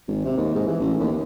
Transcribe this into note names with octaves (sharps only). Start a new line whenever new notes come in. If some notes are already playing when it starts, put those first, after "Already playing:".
G#1
C3
D#2
G#2
E3
A1
D#2
D#2